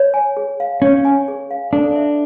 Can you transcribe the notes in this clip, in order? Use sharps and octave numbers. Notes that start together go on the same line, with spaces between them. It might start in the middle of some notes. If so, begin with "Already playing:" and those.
Already playing: C#5
G#5
G#4
F5
C#4 C#5
G#5
G#4
F5
D4 A4
E5